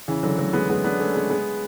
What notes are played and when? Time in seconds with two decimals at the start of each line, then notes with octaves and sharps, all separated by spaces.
0.08 C#3 E3
0.23 D3 F#3
0.38 F#3 A3
0.53 G#3 B3
0.69 G#3 B3
0.84 B3 D4
1.00 A3 C#4
1.15 G#3 B3
1.30 G#3 B3